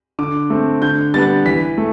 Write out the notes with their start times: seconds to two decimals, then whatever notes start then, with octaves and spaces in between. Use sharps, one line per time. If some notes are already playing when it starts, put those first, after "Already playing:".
0.19 D3 D6
0.50 A3 C4
0.82 D3 G6
1.14 G3 B3 D4 A6
1.46 E3 B6
1.78 A3